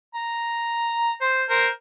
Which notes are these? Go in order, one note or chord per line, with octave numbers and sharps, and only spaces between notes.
A#5
C5
A#4 C5